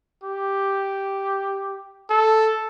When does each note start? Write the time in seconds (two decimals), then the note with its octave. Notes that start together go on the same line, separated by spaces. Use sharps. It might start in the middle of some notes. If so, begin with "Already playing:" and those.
0.23 G4
2.10 A4